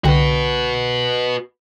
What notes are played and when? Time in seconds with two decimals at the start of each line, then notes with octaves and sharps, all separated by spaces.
0.04 C2 D3 F#4 B4 G5